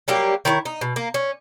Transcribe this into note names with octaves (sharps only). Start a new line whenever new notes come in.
F#3 G3 A#3 G4
D#3 E4 B4 C#5
D#4
B2
A#3
C#4